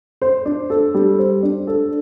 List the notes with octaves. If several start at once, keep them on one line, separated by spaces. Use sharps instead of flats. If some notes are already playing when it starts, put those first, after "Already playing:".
C5
D4
A4
G3
C5
D4
A4